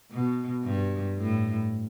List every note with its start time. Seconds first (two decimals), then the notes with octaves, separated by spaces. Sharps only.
0.11 B2
0.64 G2
1.17 A2